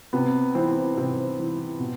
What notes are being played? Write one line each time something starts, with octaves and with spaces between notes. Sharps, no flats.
C3 B3
E3 C4
C3 C4
E3
B2